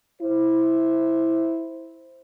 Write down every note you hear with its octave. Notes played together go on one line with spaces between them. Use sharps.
E4 C5